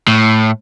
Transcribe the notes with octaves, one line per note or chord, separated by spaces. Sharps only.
A2